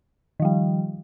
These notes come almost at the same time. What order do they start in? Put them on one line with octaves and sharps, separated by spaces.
D#3 F3 G3